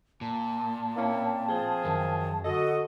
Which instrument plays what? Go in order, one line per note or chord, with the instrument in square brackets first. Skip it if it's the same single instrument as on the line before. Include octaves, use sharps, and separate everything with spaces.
[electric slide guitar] A#2 [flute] A5
[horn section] A#3 C#4 E4 [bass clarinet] C4
[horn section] F3 G#4
[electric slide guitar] F#2 [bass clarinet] D#3
[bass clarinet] D3 [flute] F#4 [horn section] A4 D#5